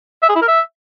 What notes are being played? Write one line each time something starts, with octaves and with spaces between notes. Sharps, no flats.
E5
G#4
E4
A#4
E5